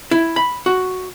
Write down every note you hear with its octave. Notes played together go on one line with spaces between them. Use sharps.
E4
B5
F#4